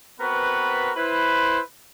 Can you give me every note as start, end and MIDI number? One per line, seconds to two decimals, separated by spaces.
0.20 0.91 59
0.20 0.91 60
0.20 0.91 66
0.20 0.91 70
0.20 0.91 71
0.96 1.59 64
0.96 1.59 71
0.96 1.59 72